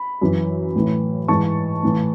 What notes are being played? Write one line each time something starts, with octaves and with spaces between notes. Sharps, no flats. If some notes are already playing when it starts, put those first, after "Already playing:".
Already playing: B5
F#2 E3
A2 E3
G#2 E3 A5 C#6
A2 E3